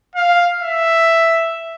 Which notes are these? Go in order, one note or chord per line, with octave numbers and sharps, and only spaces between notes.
F5
E5